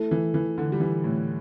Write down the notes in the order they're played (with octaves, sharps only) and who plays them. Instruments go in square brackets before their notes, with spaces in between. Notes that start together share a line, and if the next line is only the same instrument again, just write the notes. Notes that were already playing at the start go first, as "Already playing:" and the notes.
Already playing: [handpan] A3 E4 A4
[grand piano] E3
E3
D3
G3
E3
A2